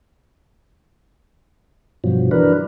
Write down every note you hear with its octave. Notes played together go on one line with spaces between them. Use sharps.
G2 B2 F3 F#3
E3 F#3 D4 A#4 B4